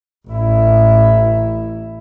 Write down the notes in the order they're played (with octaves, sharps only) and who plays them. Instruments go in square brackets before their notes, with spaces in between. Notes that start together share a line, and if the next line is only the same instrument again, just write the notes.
[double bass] A1 E4